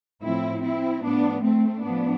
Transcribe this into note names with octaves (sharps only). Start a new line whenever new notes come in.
A2 F3 C4 E4
C4 E4
A2 F3 B3 D4
A3 C4
A2 F3 B3 D4